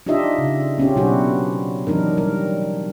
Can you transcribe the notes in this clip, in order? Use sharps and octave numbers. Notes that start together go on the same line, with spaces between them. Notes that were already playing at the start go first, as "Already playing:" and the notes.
D4 D#4 F4 G4 D#5 E5
C#3
C4 C#4 G4
B2 F#3 D4 E4 F#4 G4
E3 F#3 D4 D#4 A#4
G3 A#4